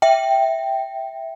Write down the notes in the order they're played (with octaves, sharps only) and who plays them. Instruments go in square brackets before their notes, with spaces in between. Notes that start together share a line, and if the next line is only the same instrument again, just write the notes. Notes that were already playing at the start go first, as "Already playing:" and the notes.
[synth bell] E5 G5